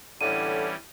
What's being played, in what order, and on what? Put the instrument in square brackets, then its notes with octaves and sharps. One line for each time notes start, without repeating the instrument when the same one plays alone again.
[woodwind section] A2 [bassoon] D3 [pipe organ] E3 G3 C#4 [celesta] D#7